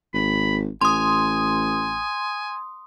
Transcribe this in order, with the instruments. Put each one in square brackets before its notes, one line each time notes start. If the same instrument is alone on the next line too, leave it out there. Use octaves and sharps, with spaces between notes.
[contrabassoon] G#1 [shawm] B5
[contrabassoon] A1 [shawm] G#5 [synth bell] C6 D#6